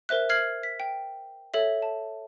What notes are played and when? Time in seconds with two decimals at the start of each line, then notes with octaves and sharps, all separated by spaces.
0.09 A#4 C5 E5 F#6
0.29 F6 G#6 C7 F#7
0.63 B6
0.80 G5
1.54 A4 C#5 E5
1.82 A5